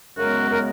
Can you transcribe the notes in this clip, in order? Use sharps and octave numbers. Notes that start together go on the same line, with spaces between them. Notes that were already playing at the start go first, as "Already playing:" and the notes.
F#2 C#3 G#3 B3 F#4 A#4
A#4